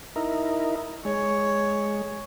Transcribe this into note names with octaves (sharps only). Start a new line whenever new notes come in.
D#4 E4 A#4
G#3 C#5